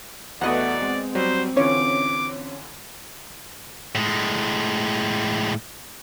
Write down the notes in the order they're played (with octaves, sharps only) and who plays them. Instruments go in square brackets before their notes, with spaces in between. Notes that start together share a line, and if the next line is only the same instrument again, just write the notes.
[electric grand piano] E2 [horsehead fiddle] A3 F#4 [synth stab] B3 D#5 F#5 [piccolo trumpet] D5
[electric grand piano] G#3 [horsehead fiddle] C4
[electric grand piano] F#3 G3 [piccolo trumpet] C5
[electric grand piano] D3 E3 F4 [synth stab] C#4 C#5 [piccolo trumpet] D6
[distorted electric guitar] A2 G#3